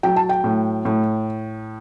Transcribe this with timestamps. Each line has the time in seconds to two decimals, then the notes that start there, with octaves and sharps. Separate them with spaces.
0.03 F#3 G5
0.16 A5
0.29 G5
0.44 A2
0.85 A2